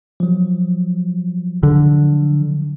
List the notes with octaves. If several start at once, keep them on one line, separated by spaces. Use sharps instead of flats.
F3 F#3
D3